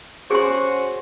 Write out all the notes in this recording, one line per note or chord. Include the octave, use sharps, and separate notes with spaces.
C#4 F#4 G#4 C5 C6